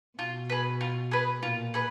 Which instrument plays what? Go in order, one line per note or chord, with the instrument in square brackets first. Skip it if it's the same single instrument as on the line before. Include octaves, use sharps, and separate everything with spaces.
[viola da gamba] B2 [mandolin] F4
[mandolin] G#4 B4
F4
G#4 B4
[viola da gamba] A#2 [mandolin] F4
[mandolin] G#4 B4